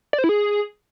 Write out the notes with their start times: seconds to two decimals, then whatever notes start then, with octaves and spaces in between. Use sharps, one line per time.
0.13 D5
0.18 C5
0.24 E4
0.29 G#4